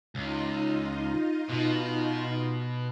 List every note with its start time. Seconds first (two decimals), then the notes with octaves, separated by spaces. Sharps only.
0.15 C#2 D#4 F4 D#5
1.50 B2